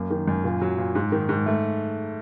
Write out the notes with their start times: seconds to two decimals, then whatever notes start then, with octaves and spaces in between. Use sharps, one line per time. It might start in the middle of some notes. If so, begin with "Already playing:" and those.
Already playing: F#2 A#3
0.11 D#3
0.28 F#2
0.44 A#2
0.61 F#3
0.78 A#2
0.95 G#2
1.12 D#3
1.29 G#2
1.46 A3